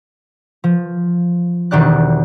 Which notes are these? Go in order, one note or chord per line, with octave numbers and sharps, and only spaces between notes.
F3
E1 D#3 G4 D5 F#6